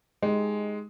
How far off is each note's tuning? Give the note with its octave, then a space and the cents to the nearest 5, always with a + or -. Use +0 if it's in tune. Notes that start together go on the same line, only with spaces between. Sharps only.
G#3 +5 D#4 +0 G4 +0